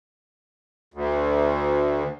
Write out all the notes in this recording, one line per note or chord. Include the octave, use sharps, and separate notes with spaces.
D2